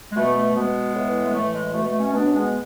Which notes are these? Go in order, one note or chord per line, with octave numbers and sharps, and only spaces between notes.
G#3
B2 A3
A3
B2 G#3 B3
A2 E3
G#3
A2 E3 A3
G#3
B2 A3
A3
A3 C#4
B2 B3 D4
C#4
G#3 B3